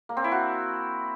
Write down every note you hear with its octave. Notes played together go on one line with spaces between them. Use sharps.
A#3
C4
E4
F#4